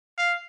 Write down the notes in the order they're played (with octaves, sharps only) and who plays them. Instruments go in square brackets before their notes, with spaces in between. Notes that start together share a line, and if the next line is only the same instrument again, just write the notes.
[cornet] F5